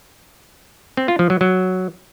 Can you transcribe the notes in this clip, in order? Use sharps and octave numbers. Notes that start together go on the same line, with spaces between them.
C4
F4
F3
F#3
F#3